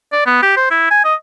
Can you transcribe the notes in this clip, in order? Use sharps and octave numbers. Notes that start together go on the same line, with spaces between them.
D5
B3
G4
C5
E4
G#5
D#5